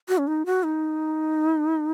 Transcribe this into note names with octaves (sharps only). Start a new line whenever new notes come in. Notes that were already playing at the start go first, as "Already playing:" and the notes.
F#4
C#4
D#4
F#4
D#4